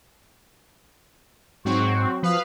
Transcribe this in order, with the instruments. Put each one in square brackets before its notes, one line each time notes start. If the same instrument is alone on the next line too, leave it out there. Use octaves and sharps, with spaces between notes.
[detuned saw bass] G#2 [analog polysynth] F#3 C4 F#4 [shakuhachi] C#6
[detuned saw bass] F3 [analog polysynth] B4 F5 [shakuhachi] D#6